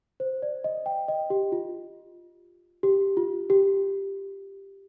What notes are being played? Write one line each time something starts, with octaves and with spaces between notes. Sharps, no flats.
C5
D5
D#5
G5
D#5
G4
F4
G4
F4
G4